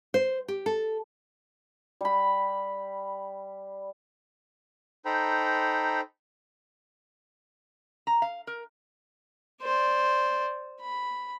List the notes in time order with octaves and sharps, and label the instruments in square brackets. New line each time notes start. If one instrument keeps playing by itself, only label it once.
[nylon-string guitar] C5
G4
A4
[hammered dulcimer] G3 B5
[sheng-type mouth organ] D#4 A4 C5 G5 A#5 B5
[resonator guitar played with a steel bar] A#5
F5
A#4
[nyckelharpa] C5 D5
B5